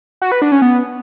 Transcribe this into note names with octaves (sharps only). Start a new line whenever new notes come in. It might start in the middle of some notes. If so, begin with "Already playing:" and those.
F#4
B4
D4
C#4
B3